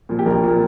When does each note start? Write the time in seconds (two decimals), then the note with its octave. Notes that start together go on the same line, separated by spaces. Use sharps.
0.09 A#2 F3
0.19 G4
0.26 A#1 A#4
0.44 A#2 F3